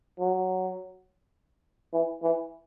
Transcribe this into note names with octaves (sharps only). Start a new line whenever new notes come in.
F#3
E3
E3